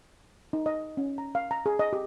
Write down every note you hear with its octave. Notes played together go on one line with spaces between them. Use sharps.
D#4
D#5
C#4
A#5
F5
A#5
G#4
D#5
G4